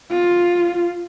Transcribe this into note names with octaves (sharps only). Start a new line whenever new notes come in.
F4